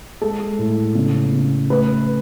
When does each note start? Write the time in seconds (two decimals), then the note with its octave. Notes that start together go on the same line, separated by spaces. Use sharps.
0.22 G#3 A4
0.59 A2
0.95 C#3
1.33 C#3
1.70 A3 B4